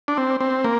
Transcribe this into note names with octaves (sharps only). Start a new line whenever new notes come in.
D4
C4
C4
A#3